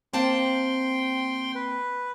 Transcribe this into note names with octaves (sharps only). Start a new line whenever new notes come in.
A#3 C4 G5 A5 C6
B4